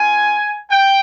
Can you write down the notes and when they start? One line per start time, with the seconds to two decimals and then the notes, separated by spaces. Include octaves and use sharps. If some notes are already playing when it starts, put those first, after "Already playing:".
Already playing: C4 F4 G#5
0.71 G5